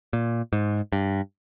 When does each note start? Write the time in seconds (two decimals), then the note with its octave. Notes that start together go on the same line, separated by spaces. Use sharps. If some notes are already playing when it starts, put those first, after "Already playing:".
0.13 A#2
0.53 G#2
0.92 G2